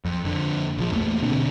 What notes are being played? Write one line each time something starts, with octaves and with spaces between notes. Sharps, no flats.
F2
F2 D3
A#1 F3
E2 A3 A#3
B2 D3 C4 D4